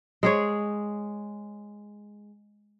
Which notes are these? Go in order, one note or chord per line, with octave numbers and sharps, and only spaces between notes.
G#3 G#4 C#5